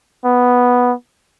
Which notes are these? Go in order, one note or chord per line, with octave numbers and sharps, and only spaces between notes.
B3